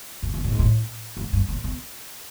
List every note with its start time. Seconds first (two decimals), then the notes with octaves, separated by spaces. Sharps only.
0.23 G2
0.34 F#2
0.44 A2
0.52 G#2
0.59 A2
1.17 G#2
1.33 G2
1.48 A2
1.64 B2